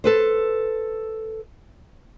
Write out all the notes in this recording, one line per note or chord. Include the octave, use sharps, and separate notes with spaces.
A4 B4 C5